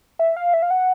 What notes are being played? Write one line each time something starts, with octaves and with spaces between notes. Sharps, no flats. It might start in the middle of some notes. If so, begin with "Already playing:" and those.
E5
F5
E5
F5
F#5